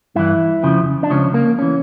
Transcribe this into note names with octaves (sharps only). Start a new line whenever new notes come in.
G2 E3 E4
F2 C#3 F3
D4
C#2 C#3 F3 C#4
A#3
E3 C#4